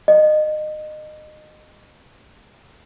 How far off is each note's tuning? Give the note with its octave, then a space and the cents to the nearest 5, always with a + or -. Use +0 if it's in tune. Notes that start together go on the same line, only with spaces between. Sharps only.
D#5 -25